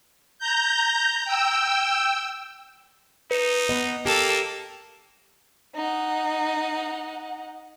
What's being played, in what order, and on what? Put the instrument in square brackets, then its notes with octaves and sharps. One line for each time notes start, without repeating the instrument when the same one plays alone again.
[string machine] A#5 G6
G5 E6
[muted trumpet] D#4 [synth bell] B4 C#7 E7
[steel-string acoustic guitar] B3 B4 [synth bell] D#5
[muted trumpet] A#3 [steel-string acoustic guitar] G4 A#4 [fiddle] A4
[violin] D#4 F#5